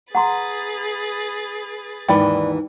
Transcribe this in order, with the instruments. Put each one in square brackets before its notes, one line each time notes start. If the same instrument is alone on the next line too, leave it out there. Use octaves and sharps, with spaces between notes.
[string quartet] G#4 B4 A6 [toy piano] F#5 A#5 C6
[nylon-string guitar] D#2 G#2 E3 [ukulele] D5 B5 [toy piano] G5